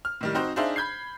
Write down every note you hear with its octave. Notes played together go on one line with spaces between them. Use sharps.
F6
A2 D#3 G3
C4 D#4 F#4 C5
D4 D#4 G#4 C5 E5 F5
B5 G6 G#6 C7